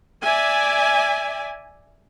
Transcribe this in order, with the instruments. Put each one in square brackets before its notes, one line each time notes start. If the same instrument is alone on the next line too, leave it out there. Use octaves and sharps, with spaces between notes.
[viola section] D5 E5 G#5